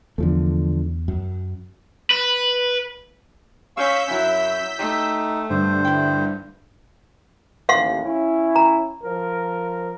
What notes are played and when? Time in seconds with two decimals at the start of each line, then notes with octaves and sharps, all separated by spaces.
0.18 E2 D3 F3 A3
1.08 F#2
2.10 B4
3.77 C#4 F5 C#6 E6 G6 B6
4.11 F#2 F#3 E4
4.79 A3 D#4 G4
5.50 G2 D3 C5
5.85 E4 G5
7.69 A1 D#2 F5 F#5 C6
8.04 C#4 E4
8.56 A#5
9.03 F3 A#4